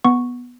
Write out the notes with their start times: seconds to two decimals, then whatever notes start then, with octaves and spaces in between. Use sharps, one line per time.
0.04 B3 C#6